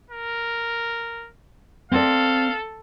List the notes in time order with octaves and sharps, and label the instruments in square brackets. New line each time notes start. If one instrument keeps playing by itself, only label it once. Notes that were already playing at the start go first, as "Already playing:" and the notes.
[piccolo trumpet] A#4
[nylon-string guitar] C4 D5 [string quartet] A4 [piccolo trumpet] F5